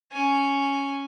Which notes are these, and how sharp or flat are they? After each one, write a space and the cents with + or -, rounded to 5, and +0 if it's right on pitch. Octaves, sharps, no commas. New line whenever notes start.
C#4 +0 G#5 +0